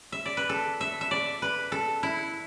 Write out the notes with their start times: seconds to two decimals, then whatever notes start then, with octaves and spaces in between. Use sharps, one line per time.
0.12 E5
0.26 D5
0.37 B4
0.49 A4
0.81 E5
1.01 E5
1.11 D5
1.42 B4
1.72 A4
2.03 E4